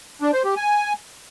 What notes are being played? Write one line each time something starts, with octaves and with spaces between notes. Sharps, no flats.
D4
C5
G4
G#5